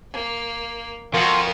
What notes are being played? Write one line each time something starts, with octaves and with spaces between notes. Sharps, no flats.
A#3
F2 F4 F#4 A#4 C#6